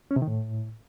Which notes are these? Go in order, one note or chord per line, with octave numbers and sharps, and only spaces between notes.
C#4
C3
D#3
A2